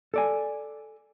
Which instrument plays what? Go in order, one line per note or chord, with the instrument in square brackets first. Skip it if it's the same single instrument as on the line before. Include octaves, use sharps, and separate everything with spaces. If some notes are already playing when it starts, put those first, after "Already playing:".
[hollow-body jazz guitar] A4 D5 G#5